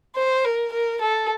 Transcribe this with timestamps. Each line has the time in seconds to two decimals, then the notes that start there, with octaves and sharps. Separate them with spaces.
0.16 C5
0.45 A#4
0.73 A#4
1.02 A4